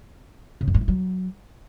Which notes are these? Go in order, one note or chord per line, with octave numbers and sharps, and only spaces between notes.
C#3
F#2
G2
E3
F#3